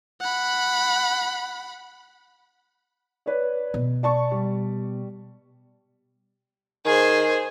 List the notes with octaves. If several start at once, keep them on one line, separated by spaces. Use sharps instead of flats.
F#5 B5
B4 C#5 D5
B2
D5 A5 C#6
G3
D#3 G#4 C5